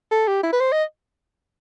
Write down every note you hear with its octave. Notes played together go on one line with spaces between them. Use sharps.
A4
G4
E4
B4
C5
D#5